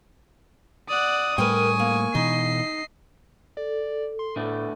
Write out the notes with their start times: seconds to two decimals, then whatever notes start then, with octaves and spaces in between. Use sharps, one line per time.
0.89 D5 F#5 D#6
1.38 A2 G3 A3 A#4 B4 G5 G#5 C#6
1.79 A#3
2.15 B2 E3 D#4 D#5 C7
3.57 A4 D5
4.19 C6
4.36 A2 D3 A3 B3